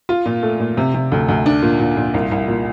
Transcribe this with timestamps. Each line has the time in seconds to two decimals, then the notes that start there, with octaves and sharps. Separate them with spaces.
0.09 F4
0.26 A#2
0.43 A3
0.60 A#2
0.77 C3
0.94 C3
1.12 D2
1.29 D2
1.46 D4
1.62 A#2
1.80 A#2
1.97 A#2
2.14 C2
2.31 C2
2.48 A#2